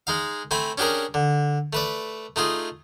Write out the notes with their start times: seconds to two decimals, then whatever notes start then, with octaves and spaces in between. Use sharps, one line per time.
0.07 G#3 D#4 F5
0.51 A3 C4 G#5 B5
0.78 C#4 D4 G4 G#4 A#4
1.14 D3
1.73 A3 B4 D5
2.36 A3 D#4 F4 G#4